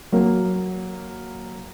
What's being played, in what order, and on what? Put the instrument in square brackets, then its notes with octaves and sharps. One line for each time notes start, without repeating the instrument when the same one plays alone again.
[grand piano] F#3 A#3